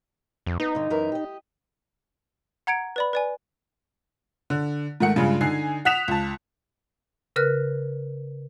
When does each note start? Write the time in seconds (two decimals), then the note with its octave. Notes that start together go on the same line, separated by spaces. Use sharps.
0.46 F2
0.60 B3 D#4
0.75 G2 D3
0.90 F#2 E3 A#4
1.12 G4 D#5
2.67 F#5 A#5 G#6 C#7 D7
2.96 B4 D5 B5
3.13 B4 D5 G#5
4.50 D3
5.00 G#2 D#3 A3 F#5 C#7
5.16 G2 C#3 F3 G#3
5.41 D3 D#4 G#5 C7
5.85 F#5 D#6 F#6 B6 E7 F7
6.08 C#2 A5
7.36 C#3 A#4 B4 F6 F#6